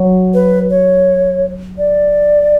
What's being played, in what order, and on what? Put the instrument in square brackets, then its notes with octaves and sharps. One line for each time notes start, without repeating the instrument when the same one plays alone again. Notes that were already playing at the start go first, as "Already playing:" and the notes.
Already playing: [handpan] F#3
[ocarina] B4
C#5
D5